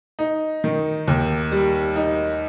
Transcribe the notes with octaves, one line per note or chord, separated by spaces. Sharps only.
D#4
D#3
D#2
G3
D#4